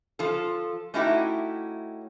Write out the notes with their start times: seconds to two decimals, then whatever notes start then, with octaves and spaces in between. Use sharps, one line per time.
0.19 F3 F4 A4
0.94 A3 C#4 D#4 E4 F#4 G4